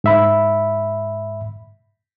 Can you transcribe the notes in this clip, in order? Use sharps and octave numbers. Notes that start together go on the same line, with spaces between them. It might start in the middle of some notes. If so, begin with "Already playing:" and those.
G#2 E5 B5